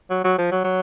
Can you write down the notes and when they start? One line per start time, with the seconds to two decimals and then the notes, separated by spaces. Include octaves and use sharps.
0.10 F#3
0.24 F#3
0.38 F3
0.51 F#3
0.64 F#3